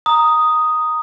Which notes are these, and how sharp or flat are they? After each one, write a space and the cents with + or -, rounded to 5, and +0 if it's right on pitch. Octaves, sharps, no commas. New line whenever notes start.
A#5 +0 D#6 +0